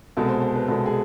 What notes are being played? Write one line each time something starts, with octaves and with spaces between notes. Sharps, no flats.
C2 B2 G#3 A4
C5
C5
B4
C2 B2 G#3 A4
G#4